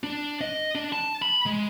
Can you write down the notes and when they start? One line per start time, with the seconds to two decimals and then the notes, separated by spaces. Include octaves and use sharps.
0.03 D4
0.41 D#5
0.75 D4
0.93 A5
1.22 B5
1.46 G#3